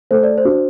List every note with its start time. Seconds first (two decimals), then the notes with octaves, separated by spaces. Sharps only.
0.11 A3 C5
0.23 D5
0.38 C5
0.45 D4 F#4